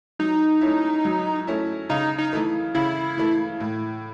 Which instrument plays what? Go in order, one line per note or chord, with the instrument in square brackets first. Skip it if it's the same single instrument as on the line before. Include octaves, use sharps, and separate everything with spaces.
[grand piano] F#3 [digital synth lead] D#4
[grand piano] A3 C#4 E4
F#3
A3 C#4 E4
[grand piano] C#3 [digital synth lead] D#4
[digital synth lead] D#4
[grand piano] E3 A3
[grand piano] C#3 [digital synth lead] E4
[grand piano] E3 A3
A2